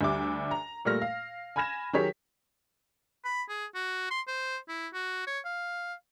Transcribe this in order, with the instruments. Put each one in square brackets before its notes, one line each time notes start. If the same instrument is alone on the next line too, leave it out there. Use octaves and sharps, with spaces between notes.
[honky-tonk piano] D2 G3 E5 D6
A#5
A#2 G3 A3 F6 A#6
F5
G#5 B5 F6 G#6 A#6 E7
D#3 F#3 G4 G#4 C#5 B6
[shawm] B5
G#4
F#4
C6
C5
E4
F#4
C#5
F5